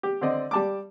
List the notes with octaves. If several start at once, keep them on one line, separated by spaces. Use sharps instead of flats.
G4
D3 C4 D5 D#5
G3 A5 D6